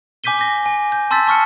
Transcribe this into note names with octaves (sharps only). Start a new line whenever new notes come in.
G#5 D6 G6 B6 D#7 G7
D6 A#6
G#5
G6
A5 C6 E6 G6 A6 B6
A5 C#6 F6 C#7